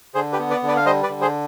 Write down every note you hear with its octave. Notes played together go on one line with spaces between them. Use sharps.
D3 G#4 C5
G4 B4
B3
B4 D5
D3
B4 D5
F5
G3 C5 D#5
B4 D5
D3
G#4 C5